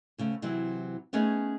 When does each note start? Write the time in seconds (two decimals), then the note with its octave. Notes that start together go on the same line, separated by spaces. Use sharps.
0.18 D2 C#3 A3
0.42 C3 E3 F#3 C4 E4
1.13 A3 B3 C#4 D#4 G#4 B4